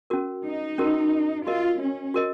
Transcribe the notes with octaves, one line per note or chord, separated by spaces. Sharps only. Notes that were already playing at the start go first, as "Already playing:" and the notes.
C#4 F#4 A#4
D#4
C#4 F#4 A#4
F4 F#4 A#4 D#5
C#4
F#4 A#4 D#5